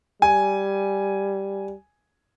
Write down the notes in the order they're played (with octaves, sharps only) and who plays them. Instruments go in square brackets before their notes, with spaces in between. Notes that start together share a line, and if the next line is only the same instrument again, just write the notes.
[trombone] G3 [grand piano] G#5